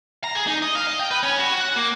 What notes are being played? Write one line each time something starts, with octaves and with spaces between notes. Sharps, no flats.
A#5
G#4
D#4
D#5
F5
D#5
G5
B4
C#4
F#4
F#5
A#3